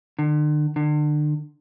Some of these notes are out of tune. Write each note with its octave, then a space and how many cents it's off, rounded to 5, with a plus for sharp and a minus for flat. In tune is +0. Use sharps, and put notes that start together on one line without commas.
D3 +40
D3 +35